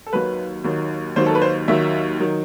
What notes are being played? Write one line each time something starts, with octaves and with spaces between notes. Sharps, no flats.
A4
D#2 D#3 F#3 B4
D#2 D#3 F#3
D#2 D#3 F#3 C5
A4
B4
C5
D#2 D#3 F#3 E5
D#3 F#3